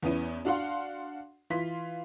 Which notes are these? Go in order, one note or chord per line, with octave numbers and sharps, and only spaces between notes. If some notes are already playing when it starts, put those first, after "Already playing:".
E2 B3 C#4 E4 D#7
D4 F#4 F5 F#5 C6
E3 F4 C6 B6